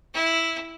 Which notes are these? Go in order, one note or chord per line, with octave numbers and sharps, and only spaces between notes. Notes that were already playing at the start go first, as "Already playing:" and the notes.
E4